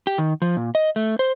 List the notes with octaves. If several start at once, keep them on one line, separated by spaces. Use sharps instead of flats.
G4
D#3
F3
A#2
D#5
A3
C5